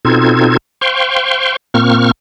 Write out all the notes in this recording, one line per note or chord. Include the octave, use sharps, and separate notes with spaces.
B2 C4 D#4 F4 A4 G#6
C5 F5 G5 C6 C#6
A#2 A#3 C4 C#6 F6